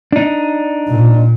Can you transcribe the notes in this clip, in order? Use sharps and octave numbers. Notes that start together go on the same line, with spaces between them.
D4 D#4
A#2